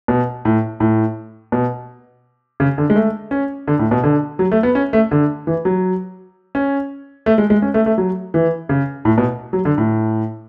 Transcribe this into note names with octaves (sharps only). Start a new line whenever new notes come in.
B2
A2
A2
B2
C#3
D3
G#3
A3
C#4
D3
A2
B2
D3
F#3
A3
B3
C#4
A3
D3
E3
F#3
C#4
A3
G#3
G#3
C#4
A3
A3
F#3
E3
C#3
A2
B2
F#3
D3
A2